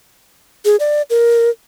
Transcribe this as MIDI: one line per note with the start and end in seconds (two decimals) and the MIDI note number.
0.65 0.76 68
0.80 1.02 74
1.10 1.50 70